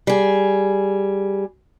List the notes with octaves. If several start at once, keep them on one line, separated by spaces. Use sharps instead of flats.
G3 G#4